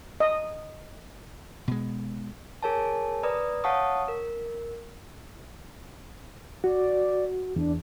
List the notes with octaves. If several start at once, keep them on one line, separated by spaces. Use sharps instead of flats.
D#5
B2 G#3
G#4 A#4 C#5 G#5 A5
B4 D5 A#5 D#6
C#5 F5 F#5 A5 C#6 D#6
A#4
F#4 D5
E2 D4